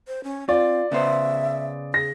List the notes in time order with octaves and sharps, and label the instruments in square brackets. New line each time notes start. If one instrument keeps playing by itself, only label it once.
[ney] C5
C#4
[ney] C4 [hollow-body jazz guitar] F4 [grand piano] D5
[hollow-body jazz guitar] C#3 B3 C5 [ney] E5
[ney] G#4 [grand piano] A#6